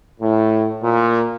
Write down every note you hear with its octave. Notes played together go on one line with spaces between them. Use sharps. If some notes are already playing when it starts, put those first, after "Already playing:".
A2
A#2